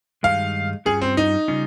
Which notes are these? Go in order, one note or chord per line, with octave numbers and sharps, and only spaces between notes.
G2 D#3 G#3 D#4 F5
G2 G3 C#4 F4 G#4
C4
D#4
C#3 G3 C#4 F4